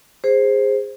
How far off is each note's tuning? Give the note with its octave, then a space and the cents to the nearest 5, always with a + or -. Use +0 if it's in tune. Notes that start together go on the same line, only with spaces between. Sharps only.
G#4 -20 C5 +10